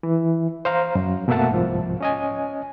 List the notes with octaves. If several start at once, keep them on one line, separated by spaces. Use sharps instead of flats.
E3
C5 F5 A#5
F#2
B2 A3 A#3 E5 F#5 A5
C2 G#2 F3
C#4 D#5 G#5